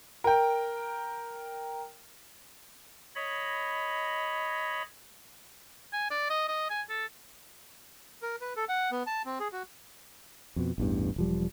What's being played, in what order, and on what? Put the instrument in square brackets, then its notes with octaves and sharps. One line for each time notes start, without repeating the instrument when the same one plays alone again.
[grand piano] A#4 G5
[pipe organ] C#5 D#5 B5
[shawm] G#5
D5
D#5
D#5
G#5
A4
[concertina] A#4
B4
A4
F#5
B3
A5
C4
G#4
F#4
[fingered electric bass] F2 B2
A1 E2 G2
E1 F3 G3